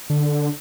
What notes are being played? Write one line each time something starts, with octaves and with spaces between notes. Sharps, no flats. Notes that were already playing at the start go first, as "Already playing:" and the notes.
D3